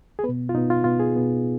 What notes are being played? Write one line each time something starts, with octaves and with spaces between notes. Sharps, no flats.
G#4
B3 B4
B2
F4
B2 B3 D#4
F4
B2 B3 F4
G#4
B2 B3